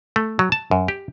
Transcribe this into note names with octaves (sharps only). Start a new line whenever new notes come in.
A3
F#3
A5
F#2
G4